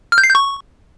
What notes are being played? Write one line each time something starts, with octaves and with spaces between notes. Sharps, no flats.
F6
G6
C7
G6
C#6